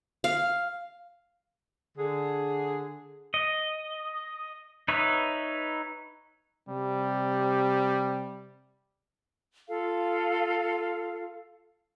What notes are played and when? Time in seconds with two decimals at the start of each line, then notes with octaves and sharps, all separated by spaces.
0.24 F5
1.98 D3 G#4
3.34 D#5
4.88 D#4 B4 C#5 E5
6.69 C3 G3
9.68 F4 A4 F5